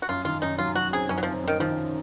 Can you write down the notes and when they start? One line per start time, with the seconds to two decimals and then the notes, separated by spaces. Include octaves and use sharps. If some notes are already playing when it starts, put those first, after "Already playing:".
0.02 F#4
0.09 F#2 F4
0.25 D#3 F4
0.42 F#2 D#4
0.58 F#3 F4
0.75 F#3 F#4
0.93 C4 G#4
1.09 F#2 C#4
1.18 F#3
1.23 F3 C4
1.44 F#2 D#3
1.60 D#3 F3